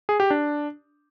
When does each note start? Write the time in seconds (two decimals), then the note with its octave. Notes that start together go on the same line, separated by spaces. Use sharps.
0.09 G#4
0.20 G4
0.30 D4